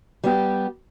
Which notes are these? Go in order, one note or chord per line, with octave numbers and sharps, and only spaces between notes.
G3 B3 G4